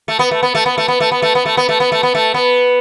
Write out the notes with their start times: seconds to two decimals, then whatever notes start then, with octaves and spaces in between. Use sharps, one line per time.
0.08 A3
0.19 B3
0.31 A3
0.42 B3
0.55 A3
0.66 B3
0.78 A3
0.88 B3
1.00 A3
1.11 B3
1.22 A3
1.35 B3
1.45 A3
1.57 B3
1.69 A3
1.80 B3
1.92 A3
2.03 B3
2.15 A3
2.34 B3